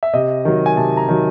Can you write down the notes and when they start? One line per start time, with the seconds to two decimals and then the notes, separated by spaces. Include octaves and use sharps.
0.03 E5
0.13 C3 D#5
0.45 D#3 F#3
0.66 G#5
0.77 C3 A5
0.97 A#5
1.09 D#3 F#3